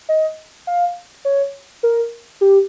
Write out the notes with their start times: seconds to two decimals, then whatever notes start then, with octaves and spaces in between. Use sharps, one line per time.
0.09 D#5
0.67 F5
1.25 C#5
1.83 A#4
2.41 G4